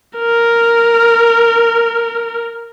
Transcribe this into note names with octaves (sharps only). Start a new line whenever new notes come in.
A#4